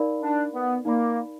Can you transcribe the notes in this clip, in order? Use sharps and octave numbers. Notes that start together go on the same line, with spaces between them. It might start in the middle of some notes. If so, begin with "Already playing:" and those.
Already playing: D#4 A#4 D5 F5 B5
D4
B3
A#3 D#4 A#4 D5 F5 B5